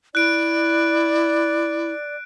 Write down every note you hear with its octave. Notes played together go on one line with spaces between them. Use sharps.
E4 D5 F#6 D7